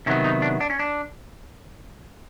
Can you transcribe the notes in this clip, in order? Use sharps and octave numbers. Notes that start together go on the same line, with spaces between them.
C3 D#3 F#3 B3 C#4
D#4
D4
D4
C#4
D4